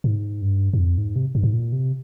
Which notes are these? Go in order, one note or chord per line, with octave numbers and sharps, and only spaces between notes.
G#2
G2
G2
F2
G#2
C3
G2
G#2
A#2
C3